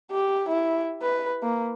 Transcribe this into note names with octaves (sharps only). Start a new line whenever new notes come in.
G4
E4
B4
A#3